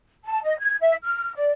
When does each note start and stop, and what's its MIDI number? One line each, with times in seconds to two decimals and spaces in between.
0.25 0.39 81
0.44 0.58 75
0.59 0.76 92
0.81 0.94 76
1.03 1.31 89
1.35 1.52 74